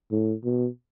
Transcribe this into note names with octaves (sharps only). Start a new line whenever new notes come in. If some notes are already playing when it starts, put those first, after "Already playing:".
A2
B2